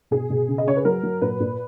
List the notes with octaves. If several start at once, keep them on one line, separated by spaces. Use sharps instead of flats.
B2 G#4
B2
C#3
D#5
C#3 C#5
B4
F#3 A#4
F#3
A#2 B4
A#2